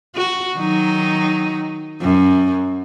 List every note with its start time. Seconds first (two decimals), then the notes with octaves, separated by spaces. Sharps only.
0.16 F#4
0.56 D#3 F#3 D#4
2.01 F#2